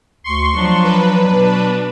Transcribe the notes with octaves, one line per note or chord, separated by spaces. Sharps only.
D2 C6 C#6
F3 F#3 D4
B4
B2 D4